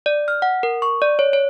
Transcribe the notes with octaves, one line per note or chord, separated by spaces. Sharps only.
D5
F6
F#5
A#4
C#6
D5
C#5
C#5